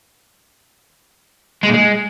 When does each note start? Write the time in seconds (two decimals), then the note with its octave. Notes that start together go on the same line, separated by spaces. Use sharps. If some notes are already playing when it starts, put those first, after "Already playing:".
1.63 G#3
1.68 A#2
1.74 G#3